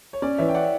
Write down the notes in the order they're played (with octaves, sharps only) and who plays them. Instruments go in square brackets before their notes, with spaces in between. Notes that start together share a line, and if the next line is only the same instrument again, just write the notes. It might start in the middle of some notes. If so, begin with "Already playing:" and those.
[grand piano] C#5
[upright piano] C#4 [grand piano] D5
[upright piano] E3 [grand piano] C#5 E5
[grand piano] G5
D5 F#5